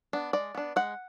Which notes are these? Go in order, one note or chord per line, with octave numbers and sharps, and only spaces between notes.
B3 D4
G#3 D5
B3 D4
G#3 F#5